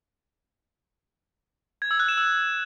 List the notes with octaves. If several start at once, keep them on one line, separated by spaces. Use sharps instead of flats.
G#6
E6
F#6
E7
E6